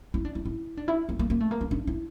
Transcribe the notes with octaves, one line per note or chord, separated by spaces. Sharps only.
E4
D4
E4
E4
D4
E4
A#3
A#3
A#3
A3
A#3
D4
D4
E4